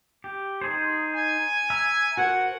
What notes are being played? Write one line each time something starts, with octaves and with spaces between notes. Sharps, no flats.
G4
D#4 G#4 C5
G#5
E5 A#5 E6
F#4 A#4 C5 F#5